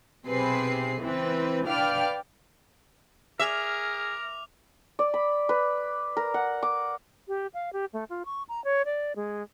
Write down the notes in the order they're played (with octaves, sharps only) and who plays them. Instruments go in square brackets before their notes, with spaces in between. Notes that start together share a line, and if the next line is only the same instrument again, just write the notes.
[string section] B1 C3 C4 G#4 B4 C7
C#2 E3 C4 B4
D4 B4 D5 F5 G5 F6
[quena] G#4 [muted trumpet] A#4 [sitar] E5 [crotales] D6 F6 F7
[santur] D5
B5
B4
A#4
F#5
D6
[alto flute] G4
F5
G4
A3
F4
C#6
A#5
C#5
D5
G#3